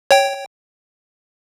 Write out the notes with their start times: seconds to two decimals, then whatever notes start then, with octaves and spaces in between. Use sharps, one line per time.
0.11 C#5 G5